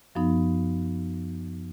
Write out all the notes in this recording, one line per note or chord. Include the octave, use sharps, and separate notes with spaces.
F#2 F3 B3 D#4